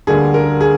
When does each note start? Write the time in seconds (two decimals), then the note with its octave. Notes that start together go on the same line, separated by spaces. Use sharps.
0.07 D2 D3 G3 A#3 G#4
0.34 A#4
0.61 G#4